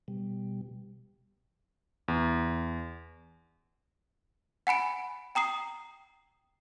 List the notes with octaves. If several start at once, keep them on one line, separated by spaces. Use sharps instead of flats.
B2 G3
E2
F#5 G#5 B5 D7
G5 A#5 D#6 C7